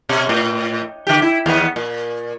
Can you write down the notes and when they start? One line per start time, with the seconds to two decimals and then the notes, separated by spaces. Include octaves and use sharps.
0.09 B2
0.29 A2
1.07 D3 G4
1.22 E4
1.46 D#2 B3
1.76 A#2